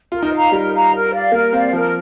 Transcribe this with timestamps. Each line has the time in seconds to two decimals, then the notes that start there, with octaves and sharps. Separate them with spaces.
0.12 F4 A#4
0.23 D#4
0.32 F5 A#5
0.52 G3 A#4
0.73 F5 A#5
0.93 A#4
1.12 D5 F5
1.32 A#3 A#4
1.53 C4 D5 F5
1.72 F3 A#4